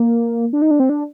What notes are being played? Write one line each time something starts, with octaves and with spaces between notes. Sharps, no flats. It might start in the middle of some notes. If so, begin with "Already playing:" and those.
Already playing: A#3
D4
D#4
D4
C4
D4